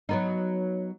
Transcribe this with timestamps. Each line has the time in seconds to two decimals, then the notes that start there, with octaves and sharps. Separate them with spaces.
0.09 F#3 B3 D#4